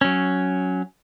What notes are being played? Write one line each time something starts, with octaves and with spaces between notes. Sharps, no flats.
F#3 C#4